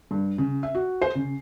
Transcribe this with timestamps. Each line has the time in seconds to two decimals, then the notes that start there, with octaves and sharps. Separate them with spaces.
0.11 G2
0.38 C#3
0.63 E5
0.75 F#4
1.02 C5
1.15 C#3